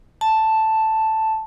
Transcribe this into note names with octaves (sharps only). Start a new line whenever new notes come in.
A5